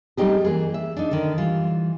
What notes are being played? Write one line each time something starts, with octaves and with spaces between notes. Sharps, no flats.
G3 A3 C4 D#4 G4 G#4
E3 A#3 G#4
E5
D4 D#4
D3 D#3
E3 G3 F4